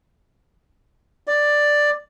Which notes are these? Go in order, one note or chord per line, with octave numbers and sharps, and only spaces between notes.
D5